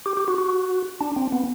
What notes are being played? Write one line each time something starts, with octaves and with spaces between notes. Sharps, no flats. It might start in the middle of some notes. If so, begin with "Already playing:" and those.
G4
G4
F#4
F#4
D4
C4
B3